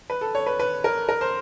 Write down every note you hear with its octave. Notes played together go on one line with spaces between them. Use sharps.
B4
A4
C#5
B4
B4
A#4
A#4
C5